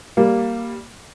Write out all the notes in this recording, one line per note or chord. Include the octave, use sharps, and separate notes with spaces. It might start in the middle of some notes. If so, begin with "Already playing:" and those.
G3 A#3